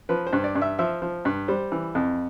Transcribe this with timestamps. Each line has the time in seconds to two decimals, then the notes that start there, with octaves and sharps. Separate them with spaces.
0.09 F3 B4
0.27 C5
0.33 G2
0.44 D5
0.55 G2
0.62 E5
0.79 F3 E5
1.02 F3
1.25 G2
1.48 G3 C5
1.72 E3
1.95 F2